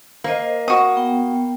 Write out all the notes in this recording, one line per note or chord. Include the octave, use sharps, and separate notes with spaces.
A#3 C5 D#5
F#4 D#6
B3 G5